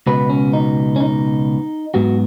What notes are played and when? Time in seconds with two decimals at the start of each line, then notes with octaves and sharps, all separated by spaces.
0.07 C#2 B2 B3 B4
0.30 C#4
0.53 D#4
0.96 C#4
1.00 D#4
1.94 G#2 F#3 B3 F#4